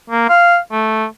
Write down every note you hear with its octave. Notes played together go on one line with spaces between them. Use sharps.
A#3
F5
A3